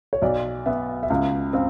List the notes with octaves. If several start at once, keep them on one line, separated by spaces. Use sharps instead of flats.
C#5
B1 D5
B3 E5
E5
C#2 F5
C4 F5